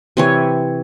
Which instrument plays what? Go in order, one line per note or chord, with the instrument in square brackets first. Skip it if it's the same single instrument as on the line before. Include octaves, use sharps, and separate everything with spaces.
[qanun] C3 E3 C#5